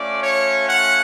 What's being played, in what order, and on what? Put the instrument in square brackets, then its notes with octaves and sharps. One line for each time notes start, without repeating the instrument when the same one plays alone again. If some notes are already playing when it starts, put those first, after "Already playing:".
Already playing: [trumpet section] A3 C#4 F4 D5
C#5
F#5